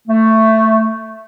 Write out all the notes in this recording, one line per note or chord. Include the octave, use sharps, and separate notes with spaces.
A3